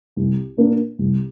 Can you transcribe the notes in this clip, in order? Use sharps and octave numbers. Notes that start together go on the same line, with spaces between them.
C2
A#2 A#3 D4
C2